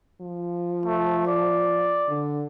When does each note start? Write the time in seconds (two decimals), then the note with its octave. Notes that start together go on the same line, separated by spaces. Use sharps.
0.21 F3
0.86 A3
1.27 D5
2.08 D3